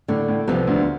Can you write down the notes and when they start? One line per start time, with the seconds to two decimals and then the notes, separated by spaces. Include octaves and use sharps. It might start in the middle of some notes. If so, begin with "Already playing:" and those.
0.08 A2 D3
0.28 A2
0.47 C2 C3 F3 B3
0.67 D2 D3